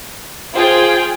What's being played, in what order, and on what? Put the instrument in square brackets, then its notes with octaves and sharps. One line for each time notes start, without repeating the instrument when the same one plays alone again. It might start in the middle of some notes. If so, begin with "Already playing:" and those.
[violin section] F4 G#4 G5 [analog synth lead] C5